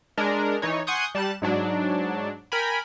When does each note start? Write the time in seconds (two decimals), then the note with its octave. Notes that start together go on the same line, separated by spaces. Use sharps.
0.17 G#3 D4 A#4
0.62 E3 D#4 C#5
0.87 F#5 G#5 C6 C#6 D#6 G6
1.15 G3 A5 F#6 E7
1.42 G#2 F#3 D4
2.52 A#4 G5 G#5 B5